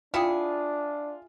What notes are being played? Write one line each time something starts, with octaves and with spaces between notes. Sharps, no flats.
D4 E4 F4 G#4 G5 G#5 D6